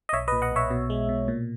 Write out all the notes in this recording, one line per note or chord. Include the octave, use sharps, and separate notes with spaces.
D#5
B1 C#5 E5
B4 D#5
A#2
D#5 F#5
B1 C#5 E5
B2
G#3
B2
A#2